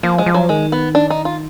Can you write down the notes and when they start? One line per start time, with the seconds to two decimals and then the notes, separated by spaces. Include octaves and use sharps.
0.03 F3 A#3
0.18 G#3
0.26 F3
0.34 F#3
0.49 D#3 G#3
0.72 B3
0.95 D4
1.10 D#4
1.25 F4